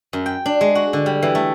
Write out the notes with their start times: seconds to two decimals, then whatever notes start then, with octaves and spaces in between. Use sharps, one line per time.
0.13 F#2
0.26 G5
0.46 D4
0.61 G#3
0.75 F#4
0.93 D3
1.06 G3
1.23 E3
1.35 A3